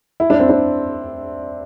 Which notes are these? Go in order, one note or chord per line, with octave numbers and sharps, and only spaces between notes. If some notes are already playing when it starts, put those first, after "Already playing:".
E4
D4
C4
D4